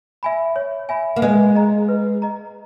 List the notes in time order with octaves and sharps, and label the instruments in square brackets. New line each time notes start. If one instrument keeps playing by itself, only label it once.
[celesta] E5 G#5 B5
C#5
E5 G#5 B5
[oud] A#3
[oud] G#3 [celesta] B4
[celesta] D#5 A#5
B4
D#5 A#5